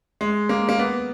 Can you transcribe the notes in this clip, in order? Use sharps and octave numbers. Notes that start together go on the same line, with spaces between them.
G#3
A#3
A#3
B3